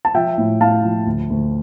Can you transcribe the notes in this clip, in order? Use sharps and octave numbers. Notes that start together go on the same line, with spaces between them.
A5
F3 E5 G5
A2
A2 F5 A5
F3
D2
D2